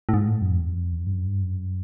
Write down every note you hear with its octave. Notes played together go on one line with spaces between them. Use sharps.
A2
G#2
A2
F#2
F2
E2
F2
E2
F2
G2
F#2
G2
F#2